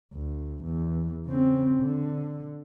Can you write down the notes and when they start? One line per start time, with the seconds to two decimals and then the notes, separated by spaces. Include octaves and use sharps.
0.14 D2
0.64 E2
1.26 C#3 C4
1.82 D3